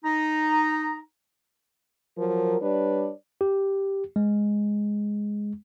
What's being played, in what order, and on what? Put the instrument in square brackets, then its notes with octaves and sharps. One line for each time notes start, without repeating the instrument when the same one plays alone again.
[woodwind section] D#4 A#5
[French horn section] F3 F#3 A#4
G3 D4 B4 C#5 D5
[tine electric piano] G4
G#3